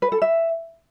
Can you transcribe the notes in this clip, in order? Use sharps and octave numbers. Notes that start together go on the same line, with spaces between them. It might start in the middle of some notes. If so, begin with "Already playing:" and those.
B4
A4
E5